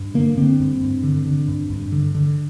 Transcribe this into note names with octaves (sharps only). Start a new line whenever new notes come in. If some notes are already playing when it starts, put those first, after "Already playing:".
Already playing: G2
D3 A#3
D3 C4
G2
G2
D3
D3
G2
G2
D3
D3